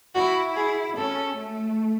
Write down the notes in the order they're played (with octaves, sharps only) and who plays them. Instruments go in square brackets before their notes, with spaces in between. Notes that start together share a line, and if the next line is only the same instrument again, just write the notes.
[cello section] E4 [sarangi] F#4
[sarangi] G#4
[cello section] C#4 [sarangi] A4
[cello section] A3